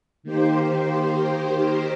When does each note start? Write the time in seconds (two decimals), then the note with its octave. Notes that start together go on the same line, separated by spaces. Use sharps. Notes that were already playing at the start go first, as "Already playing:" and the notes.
0.23 D#3 A#3 G4 C5